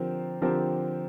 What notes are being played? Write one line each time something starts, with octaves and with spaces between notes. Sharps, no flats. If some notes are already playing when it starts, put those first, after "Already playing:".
Already playing: D3 F3 C4 G4 A#4
D3 F3 C4 G4 A#4